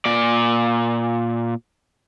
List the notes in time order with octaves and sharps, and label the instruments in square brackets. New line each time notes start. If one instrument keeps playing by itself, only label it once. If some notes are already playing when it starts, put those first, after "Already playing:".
[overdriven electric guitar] A#2 D5